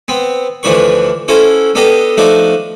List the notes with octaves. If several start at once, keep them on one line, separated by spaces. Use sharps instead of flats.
B3 C4
D2 E3 F3 D4 B4 C#6
C#4 E4 F#4 A4 C5
B3 D4 G4 A4 D#5
F3 A3 D4 D#4 F#4